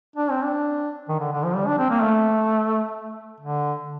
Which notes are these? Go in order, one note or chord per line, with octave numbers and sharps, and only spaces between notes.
D4
C4
D4
D#3
D3
D3
F3
G3
D4
C4
A#3
A3
D3